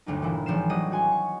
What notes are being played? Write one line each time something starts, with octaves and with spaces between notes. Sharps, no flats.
G1 D2 F#3 D#4
A#2 E3 E4 F4
G#1 F3 C4 C7 E7
A1 F#3 G3 D#5 D#6
F#4 G#5 C6
C#6